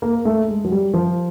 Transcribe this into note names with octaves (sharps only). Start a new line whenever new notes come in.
A#3
A3
G#3
F#3
G3
F3